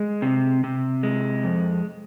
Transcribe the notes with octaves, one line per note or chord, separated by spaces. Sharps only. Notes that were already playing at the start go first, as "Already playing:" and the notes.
Already playing: G#3
C3
C3
G#3
F2